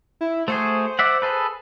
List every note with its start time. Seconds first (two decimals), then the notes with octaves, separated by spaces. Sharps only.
0.21 E4
0.48 A3 F#4 G#4 C5
0.99 D5 E5 F#5
1.22 G#4 A4 B4